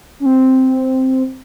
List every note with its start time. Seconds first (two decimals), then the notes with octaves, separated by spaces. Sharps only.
0.20 C#4
0.26 C4